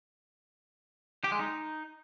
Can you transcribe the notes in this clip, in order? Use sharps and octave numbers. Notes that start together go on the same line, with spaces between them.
G4
G#3
D#4